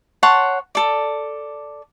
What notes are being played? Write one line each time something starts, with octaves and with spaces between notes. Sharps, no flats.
C#5 F#5 A5 C6
A4 D5